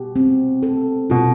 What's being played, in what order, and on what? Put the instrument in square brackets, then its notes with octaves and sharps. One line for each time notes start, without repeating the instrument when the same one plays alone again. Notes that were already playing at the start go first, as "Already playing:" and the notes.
Already playing: [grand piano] B2 [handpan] G4
[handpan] C4
A4
[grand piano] B2 [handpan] F4